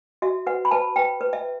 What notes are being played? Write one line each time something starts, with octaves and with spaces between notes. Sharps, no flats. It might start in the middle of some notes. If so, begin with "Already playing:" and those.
F#4 E5
B4 F#5
B5
B4 A5
B4 G5
B4
E5